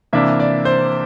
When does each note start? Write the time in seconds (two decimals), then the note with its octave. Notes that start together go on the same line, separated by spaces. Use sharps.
0.13 C3 E3 A#3 D4 E5
0.40 D5
0.65 C5